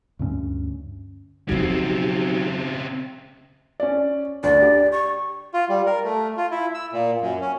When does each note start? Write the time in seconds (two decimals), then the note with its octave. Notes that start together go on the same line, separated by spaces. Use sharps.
0.19 D2 G2 A3 C#4
1.49 F2 C#3 F#3 C4 D#4 F#4 G4
3.80 C#4 D5
4.43 D2 D5
4.62 G4
4.92 C#6
5.54 F4
5.69 G3
5.86 A#4
6.04 A3
6.37 F4
6.51 E4
6.75 E6
6.92 A#2
7.21 F#2
7.41 C#4